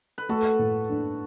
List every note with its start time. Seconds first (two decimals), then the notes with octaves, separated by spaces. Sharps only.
0.18 B4
0.29 A3 F#4 A4
0.59 A2
0.90 D4